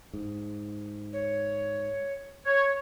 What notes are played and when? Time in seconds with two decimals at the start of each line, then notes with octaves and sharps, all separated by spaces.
0.14 G#2
1.13 C#5
2.45 C#5